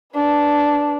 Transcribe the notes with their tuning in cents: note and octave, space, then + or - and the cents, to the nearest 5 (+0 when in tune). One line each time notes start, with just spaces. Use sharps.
D4 -10 B4 +0